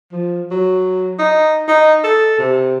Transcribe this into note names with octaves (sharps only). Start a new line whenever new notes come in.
F3
F#3
D#4
D#4
A4
C3